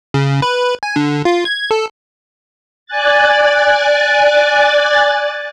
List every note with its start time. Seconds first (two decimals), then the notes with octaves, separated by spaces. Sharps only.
0.14 C#3
0.42 B4
0.83 G#5
0.96 D3
1.25 F4
1.45 G#6
1.71 A4
2.86 D5 G#5 F#6 A6